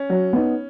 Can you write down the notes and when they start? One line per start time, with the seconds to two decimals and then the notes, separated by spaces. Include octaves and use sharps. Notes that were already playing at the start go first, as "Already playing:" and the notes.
Already playing: C#4
0.10 F#3
0.33 B3 D#4